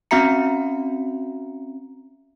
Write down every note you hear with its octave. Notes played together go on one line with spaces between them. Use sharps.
C4 C#4 F#4 E5 A#5 C#7